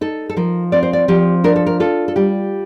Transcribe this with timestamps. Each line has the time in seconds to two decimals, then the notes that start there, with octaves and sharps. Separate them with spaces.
0.01 D#4 A4
0.29 A4
0.37 F3 A#4
0.72 C4 D5
0.83 C5
0.93 D5
1.08 F3 G4
1.44 D4 A#4
1.56 A4
1.67 A#4
1.80 F4 A4
2.08 A4
2.16 G3 G4